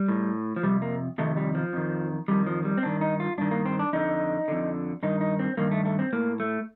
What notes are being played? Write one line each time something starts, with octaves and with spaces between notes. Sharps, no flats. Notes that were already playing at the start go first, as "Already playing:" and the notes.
Already playing: G3
A2
F3
F2 C3 G3
A#3
F2 C3 D#3 A3
G3
F3
F2 D#3
F2 D#3 G3
F3
G3
C4
G2 D#3 D4
D#4
F4
G2 D#3 D4
A#3
C4
D4
F2 D3 D#4
F2 D3
G2 D#3 D#4
D#4
C4
G2 D#3 A#3
A3
A3
C4
A2 A#3
A3